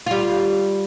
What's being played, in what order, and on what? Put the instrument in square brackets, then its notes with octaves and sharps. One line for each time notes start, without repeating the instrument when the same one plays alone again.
[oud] G3 F4